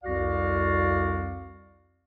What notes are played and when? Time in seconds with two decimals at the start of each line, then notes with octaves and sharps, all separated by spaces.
0.04 C2 F2 F#4 D5 F5